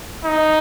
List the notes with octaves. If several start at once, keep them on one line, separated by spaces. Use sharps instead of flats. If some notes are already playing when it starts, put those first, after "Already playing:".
D#4